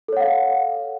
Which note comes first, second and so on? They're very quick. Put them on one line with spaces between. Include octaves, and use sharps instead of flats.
A4 C#5 F#5 F5